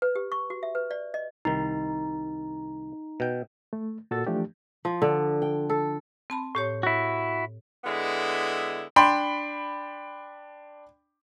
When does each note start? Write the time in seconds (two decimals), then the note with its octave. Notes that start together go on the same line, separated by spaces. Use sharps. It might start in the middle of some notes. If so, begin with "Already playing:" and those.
0.02 B4
0.15 G4
0.32 C#6
0.50 F#4
0.63 E5
0.75 B4
0.91 D5
1.14 D#5
1.45 C2 D#3 D#4
3.20 B2 G5
3.73 A3
4.11 A#2 F#4 A4 E6 A6
4.27 E3 F3 A3 D4 G4
4.85 F3
5.02 D3
5.42 G5
5.70 A4
6.30 C4 A5 B5
6.55 A2 G4 C#5
6.83 E4 F#4
7.84 D3 G#3 B3 E4
8.96 D4 G5 B5 C6